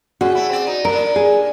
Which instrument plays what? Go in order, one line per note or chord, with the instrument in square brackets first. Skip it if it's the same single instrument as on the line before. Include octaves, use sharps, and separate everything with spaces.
[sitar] C#3 [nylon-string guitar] F#4 G#4
[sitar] A3 E4
C4 D5
D#4
[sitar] A#2 D4 [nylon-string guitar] A#4
[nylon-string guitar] G#4